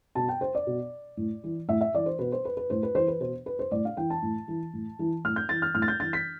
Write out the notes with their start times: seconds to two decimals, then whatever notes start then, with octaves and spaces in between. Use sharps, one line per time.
0.15 B2 A5
0.29 G5
0.41 C5
0.55 D5
0.67 B2
1.17 A2
1.44 E3
1.68 A2 E5
1.81 E5
1.94 E3 D5
2.06 C5
2.19 B2 B4
2.32 C5
2.45 B4
2.57 B4
2.70 A2 C5
2.83 B4
2.95 E3 C5
3.08 B4
3.20 B2 C5
3.46 B4
3.59 C5
3.71 A2 D5
3.85 F5
3.97 E3 G5
4.10 A5
4.22 A2
4.48 E3
4.73 A2
4.99 E3
5.24 A2 F6
5.36 G6
5.49 E3 A6
5.62 F6
5.74 A2 F6
5.82 A6
5.88 G6
6.00 E3 A6
6.13 B6